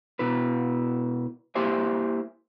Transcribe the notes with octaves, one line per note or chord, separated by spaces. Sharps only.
B2 E4 B4
A#3 E4 G4 C5 E5 G#5